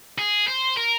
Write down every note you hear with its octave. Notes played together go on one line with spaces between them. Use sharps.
G#4
C5
A#4